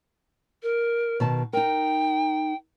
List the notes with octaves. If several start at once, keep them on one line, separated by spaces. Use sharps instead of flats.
A#4
B2 D#3 A5
D#4 A#4 G5